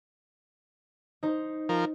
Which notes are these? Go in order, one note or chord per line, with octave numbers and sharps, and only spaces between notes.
D#4 C5
F3 A#4